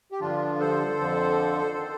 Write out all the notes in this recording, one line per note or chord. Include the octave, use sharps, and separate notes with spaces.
G4
G2 D3 F3 D4 F4
A4 C5
F2 D3 F3
D#3